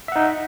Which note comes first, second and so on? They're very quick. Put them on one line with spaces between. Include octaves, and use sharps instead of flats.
E5 F#5 D#4